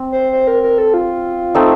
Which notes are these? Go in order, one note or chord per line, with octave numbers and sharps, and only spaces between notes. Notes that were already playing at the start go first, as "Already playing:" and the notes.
Already playing: C4
C5
C5
A#4
A#4
A4
F4
A3 C4 D#4